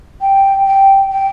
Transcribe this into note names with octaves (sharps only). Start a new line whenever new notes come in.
G5
G5
G5